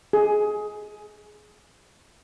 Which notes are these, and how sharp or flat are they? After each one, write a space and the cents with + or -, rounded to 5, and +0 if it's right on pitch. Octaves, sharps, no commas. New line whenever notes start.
G#4 +20